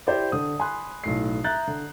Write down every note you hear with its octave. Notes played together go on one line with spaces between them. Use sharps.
E4 G4 C5 D5
D3 D#6
G#5 B5 C6 F#6
B1 A2 C7
E5 A#5 F#6 G6 A6
D3